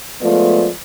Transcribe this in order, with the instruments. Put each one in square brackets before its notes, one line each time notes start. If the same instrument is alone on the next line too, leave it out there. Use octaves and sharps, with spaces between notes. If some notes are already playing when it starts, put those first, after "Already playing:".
[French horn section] F3 G#3 A3 B3 F4 D5